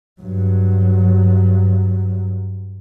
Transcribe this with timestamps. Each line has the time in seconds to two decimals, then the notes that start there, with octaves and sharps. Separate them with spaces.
0.22 G2 F#3